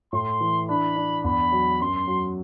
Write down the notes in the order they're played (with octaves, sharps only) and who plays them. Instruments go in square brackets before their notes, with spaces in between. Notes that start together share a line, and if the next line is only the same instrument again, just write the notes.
[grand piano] A2 [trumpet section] C6
[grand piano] E3
[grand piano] D4 [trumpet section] B5
[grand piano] D4
[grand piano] E2 [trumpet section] B5
[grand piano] F#3
[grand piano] F#2 [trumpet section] C6
[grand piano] F#3